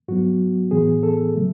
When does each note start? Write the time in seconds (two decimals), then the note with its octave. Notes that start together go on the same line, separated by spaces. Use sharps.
0.08 G#2 F#3 B3 F#4
0.71 A2 E3 B3 G#4
1.03 A4
1.35 C#3 F#3 A3